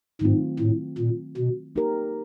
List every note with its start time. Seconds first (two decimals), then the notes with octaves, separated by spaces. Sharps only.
0.21 G#2 D#3 F#3 A3 C4 F4
0.59 A2
0.98 A#2
1.37 B2
1.76 A#3 D#4 G4 A#4